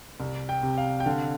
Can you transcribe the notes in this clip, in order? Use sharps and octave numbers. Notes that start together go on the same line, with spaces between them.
C2
G5
C3
F5
G5
D3 F5